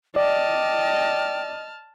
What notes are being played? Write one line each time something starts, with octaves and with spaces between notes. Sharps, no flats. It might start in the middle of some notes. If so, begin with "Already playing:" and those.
D5 D#5 G5 A5 F6